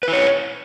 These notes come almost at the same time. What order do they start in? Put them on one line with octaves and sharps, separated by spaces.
B4 E4 C#5